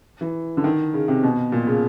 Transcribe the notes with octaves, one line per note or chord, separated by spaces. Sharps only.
E3
D3
D#3
C#3
C3
B2
A#2
C#3